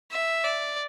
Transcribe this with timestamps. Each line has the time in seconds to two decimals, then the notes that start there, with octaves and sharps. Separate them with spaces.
0.11 E5
0.44 D5